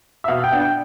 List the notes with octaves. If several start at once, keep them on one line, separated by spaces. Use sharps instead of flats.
E5
B2 F5
G5
B3 D4
G5